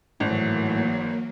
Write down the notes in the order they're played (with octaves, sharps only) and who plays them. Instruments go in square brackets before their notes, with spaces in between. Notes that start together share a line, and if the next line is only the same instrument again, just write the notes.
[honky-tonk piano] G#1 [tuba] A2 [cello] E3 F#3 [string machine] A#3